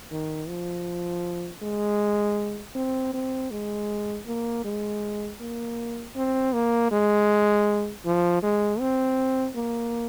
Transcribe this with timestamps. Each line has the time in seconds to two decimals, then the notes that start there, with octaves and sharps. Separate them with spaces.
0.11 D#3
0.48 F3
1.62 G#3
2.75 C4
3.14 C4
3.51 G#3
4.27 A#3
4.64 G#3
5.40 A#3
6.16 C4
6.53 A#3
6.91 G#3
8.05 F3
8.43 G#3
8.80 C4
9.55 A#3